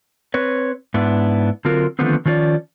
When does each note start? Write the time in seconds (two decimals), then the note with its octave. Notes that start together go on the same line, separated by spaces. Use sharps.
0.34 C4 B4 C#5
0.94 G#2 B3 D4 E4
1.65 D3 F#3 C4 F4 A#4
1.99 D3 D#3 F3 A3 B3 C4
2.26 D#3 F3 C#4 F4 D5